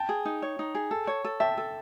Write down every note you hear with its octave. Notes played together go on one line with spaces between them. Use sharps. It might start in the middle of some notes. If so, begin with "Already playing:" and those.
Already playing: G5 A5
G#4
D#4
C#5
D#4
G#4
A4
C#5
A4
E5 G5 A5
A4